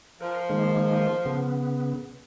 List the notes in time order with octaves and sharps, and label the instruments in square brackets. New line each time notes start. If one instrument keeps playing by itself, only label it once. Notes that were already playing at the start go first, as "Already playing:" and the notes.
[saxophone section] F3 [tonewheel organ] A#4
[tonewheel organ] D#3 G#3 A#3
C#3 B3